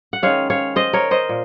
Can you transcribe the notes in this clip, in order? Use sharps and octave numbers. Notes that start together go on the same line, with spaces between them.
F#5
D#3 G#3 C#4 C#5 F5
C#5 F5
C5 D#5
A#4 C#5
C5 D#5
A#2